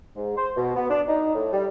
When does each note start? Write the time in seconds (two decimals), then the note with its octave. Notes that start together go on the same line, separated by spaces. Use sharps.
0.16 G#2
0.37 C5
0.56 B2
0.76 B3
0.89 D4
1.08 D#4
1.34 A2
1.53 G3